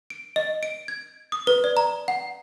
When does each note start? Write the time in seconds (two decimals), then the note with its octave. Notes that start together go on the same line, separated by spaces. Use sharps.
0.10 D7
0.36 D#5
0.63 D7
0.88 G#6
1.32 D#6
1.47 B4
1.64 D5
1.77 A#5
2.08 F#5